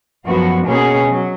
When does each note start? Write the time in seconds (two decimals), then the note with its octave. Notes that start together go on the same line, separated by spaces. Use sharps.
0.25 F#2 F3 B3 F#4
0.65 B2 A#3 C#4 G#4
1.06 F#3